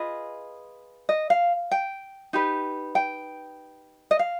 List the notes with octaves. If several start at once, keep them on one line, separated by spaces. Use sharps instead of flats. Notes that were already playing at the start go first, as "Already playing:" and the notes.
Already playing: F4 G#4 B4 D#5
D#5
F5
G5
D#4 G4 B4
G5
D#5
F5